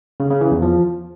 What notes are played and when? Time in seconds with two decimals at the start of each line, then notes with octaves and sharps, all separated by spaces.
0.20 C#3
0.30 C#3
0.41 E3
0.52 E2
0.62 F3